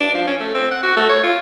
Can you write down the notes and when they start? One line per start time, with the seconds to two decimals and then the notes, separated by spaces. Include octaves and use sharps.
0.01 D4
0.14 F3
0.27 C#4
0.40 A3
0.54 C4
0.71 F#5
0.83 F#4
0.96 A3
1.09 C#5
1.24 F4